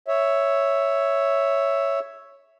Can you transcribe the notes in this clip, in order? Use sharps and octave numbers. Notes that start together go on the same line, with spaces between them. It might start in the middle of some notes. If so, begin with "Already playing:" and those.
C#5 E5